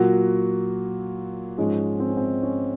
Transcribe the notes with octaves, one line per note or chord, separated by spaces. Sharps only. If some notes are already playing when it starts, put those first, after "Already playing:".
Already playing: A#2 F#3 F#4
G#2 F3 G#3 C#4
C4
C#4
C4
C#4